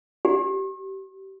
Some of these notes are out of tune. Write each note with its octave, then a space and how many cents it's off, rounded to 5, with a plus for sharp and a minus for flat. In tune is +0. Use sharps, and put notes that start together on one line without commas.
G4 -30